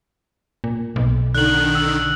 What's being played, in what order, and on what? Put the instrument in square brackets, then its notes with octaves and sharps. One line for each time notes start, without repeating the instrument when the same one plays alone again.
[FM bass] A#2
B1
[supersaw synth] D3 D#3 [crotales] F#6 F#7
[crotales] E6